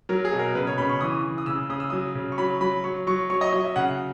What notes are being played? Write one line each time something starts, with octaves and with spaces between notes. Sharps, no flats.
F#3 A#4
G#4
B2
A#4
C#3 B4
C#5
C#3 B5
C#6
E3 D#6
E3
D#6
C#3 E6
C#3 D#6
E6
F#3 D#6
C#3
C#6
F#3 B5
F#3 B5
F#3 C#6
F#3 C#6
F#3 C#6
D#5
F#3 D#5
E5
C#3 F#5